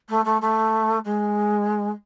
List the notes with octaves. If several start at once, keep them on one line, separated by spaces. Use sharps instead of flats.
A3
A3
A3
G#3